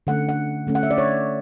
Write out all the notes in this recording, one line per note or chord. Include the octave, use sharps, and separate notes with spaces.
D3 A3 C#4 F#5
F#5
D3 A3 C#4
F#5
E5
D5
C#5